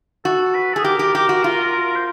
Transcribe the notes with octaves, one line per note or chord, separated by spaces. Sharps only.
F#4 A4
B4
G#4 A4
G4 A#4
G4
G4
F#4
F4
C5